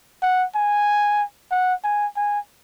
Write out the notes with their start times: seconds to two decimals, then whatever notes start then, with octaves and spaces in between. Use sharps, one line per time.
0.22 F#5
0.55 G#5
1.51 F#5
1.84 G#5
2.16 G#5